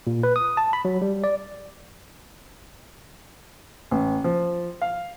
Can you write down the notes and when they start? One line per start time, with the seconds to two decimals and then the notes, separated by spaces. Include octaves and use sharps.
0.07 A#2
0.23 B4
0.36 D#6
0.57 A5
0.73 B5
0.85 F#3
1.02 G3
1.24 D5
3.91 A1
4.24 F3
4.82 F5